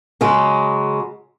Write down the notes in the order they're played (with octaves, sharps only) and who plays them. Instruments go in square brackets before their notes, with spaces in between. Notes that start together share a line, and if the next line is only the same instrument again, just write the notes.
[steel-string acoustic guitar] C#3 F#3 G#3